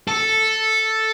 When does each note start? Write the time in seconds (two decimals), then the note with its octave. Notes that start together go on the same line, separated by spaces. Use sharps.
0.08 A4